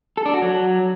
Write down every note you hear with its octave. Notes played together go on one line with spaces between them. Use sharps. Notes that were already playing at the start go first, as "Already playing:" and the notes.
A4
D4
F#4
F#3